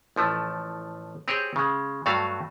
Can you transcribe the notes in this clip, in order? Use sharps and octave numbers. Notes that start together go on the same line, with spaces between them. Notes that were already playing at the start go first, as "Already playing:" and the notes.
A1 F3 A3
C4 G4 G#4 C#5
C#3 G#3
G2 F#3 A3 F#4 F5